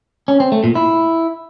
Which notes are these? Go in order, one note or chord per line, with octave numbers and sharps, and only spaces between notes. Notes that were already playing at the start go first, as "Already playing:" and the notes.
C#4
C4
A3
A#2
E4